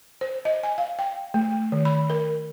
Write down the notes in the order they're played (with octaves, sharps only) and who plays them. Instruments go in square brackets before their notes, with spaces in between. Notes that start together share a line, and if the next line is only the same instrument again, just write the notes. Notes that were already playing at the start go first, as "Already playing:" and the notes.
[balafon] C5
D#5
G#5
F5
G5
A3
D#3
B5
A#4